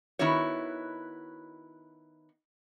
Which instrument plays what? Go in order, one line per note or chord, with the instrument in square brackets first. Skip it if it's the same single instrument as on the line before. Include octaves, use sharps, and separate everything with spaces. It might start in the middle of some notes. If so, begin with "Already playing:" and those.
[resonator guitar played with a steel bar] D#3 B3 E4 F#4 C#5